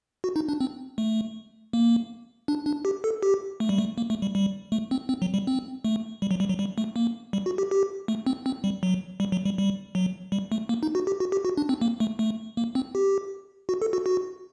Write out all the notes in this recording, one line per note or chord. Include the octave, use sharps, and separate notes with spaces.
F#4
D#4
D4
C4
A3
A#3
D4
D4
G4
A4
G4
A3
G3
A3
A#3
A3
G3
G3
A3
C4
C4
F#3
G3
C4
A3
G3
F#3
G3
F#3
G3
A3
A#3
G3
F#4
G4
G4
A3
C4
C4
G3
F#3
G3
F#3
G3
G3
F#3
G3
A3
A#3
D#4
F#4
G4
F#4
G4
F#4
D4
C4
A#3
A3
A3
A#3
C4
G4
F#4
A4
F#4
F#4